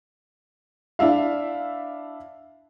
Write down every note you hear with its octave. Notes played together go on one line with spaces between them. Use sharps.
D4 E4 E5 F5